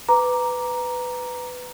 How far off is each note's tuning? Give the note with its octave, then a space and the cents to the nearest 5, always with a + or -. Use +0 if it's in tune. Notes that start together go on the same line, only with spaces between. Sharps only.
B4 +15 A#5 +5 D6 +0